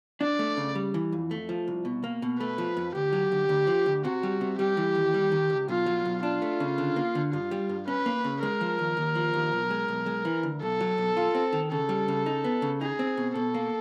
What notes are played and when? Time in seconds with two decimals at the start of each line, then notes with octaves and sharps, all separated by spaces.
0.21 D4 D5
0.39 A3
0.57 C#3
0.75 G3
0.94 E3
1.12 F2
1.31 A3
1.49 F3
1.68 C2
1.85 B2
2.04 A#3
2.22 B2
2.39 A3 B4
2.58 F3
2.77 F2
2.94 D2 G4
3.13 F#3
3.32 D2
3.49 D2
3.67 F3
3.86 D2
4.04 C3 F#4
4.23 G3
4.41 C3
4.59 G3 G4
4.77 E3
4.95 D#2
5.14 G3
5.32 D#3
5.50 C#2
5.68 B1 F4
5.86 F#3
6.05 B1
6.23 D4 F4
6.42 A3
6.60 C#3
6.78 D3
6.96 A#3
7.15 D3
7.33 G2 F4
7.51 G3
7.69 G2
7.87 C#4 B4
8.06 A#3
8.24 C#3
8.42 G#3 A#4
8.61 F3
8.79 D#2
8.97 D#2
9.15 F3
9.34 D#2
9.52 B1
9.71 G#3
9.88 B1
10.06 G#3
10.25 E3
10.43 D2
10.62 B1 A4
10.80 F#3
10.98 B1
11.17 F4
11.35 C4
11.53 D#3
11.71 C#3 A4
11.89 G3
12.08 C#3
12.26 D#4
12.44 B3
12.62 C#3
12.81 D#4 G#4
12.99 C4
13.17 B2
13.35 B2 A4
13.54 A#3